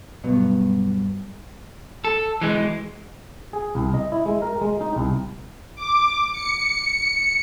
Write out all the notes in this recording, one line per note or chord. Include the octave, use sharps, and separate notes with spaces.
G2 B2 F#3 B3
A4
E3 G#3
G#4
C2
D#5
E4
G#3
A#4
G#3
D#4
C2
D6
C#7